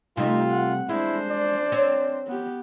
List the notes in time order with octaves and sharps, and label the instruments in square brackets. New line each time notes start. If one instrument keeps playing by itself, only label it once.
[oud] C3 G3 A3 [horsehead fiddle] D#4 [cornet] F4
[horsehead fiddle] F#5
[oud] G#3 [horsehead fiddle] D4 C5 [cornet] E4
[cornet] D5
[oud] C4 C#5
[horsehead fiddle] B3 G4